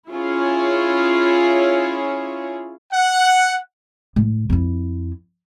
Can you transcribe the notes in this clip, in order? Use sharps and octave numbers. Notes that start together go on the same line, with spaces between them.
C#4 E4 F4 G#4 C#5
F#5
A2
F2 E4